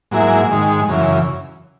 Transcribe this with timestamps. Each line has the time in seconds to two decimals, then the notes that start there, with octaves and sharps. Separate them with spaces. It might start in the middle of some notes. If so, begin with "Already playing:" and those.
0.11 G#2 F#3 A#3 E4 G#4
0.50 G#2 D#3 G#3
0.88 F#2 C#3 E3